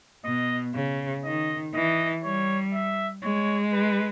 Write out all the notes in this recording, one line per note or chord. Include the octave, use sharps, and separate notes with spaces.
B2 D#5
C#3
D#3 D#5
E3 D#5
G3 C#5
E5
G#3 C#5
B4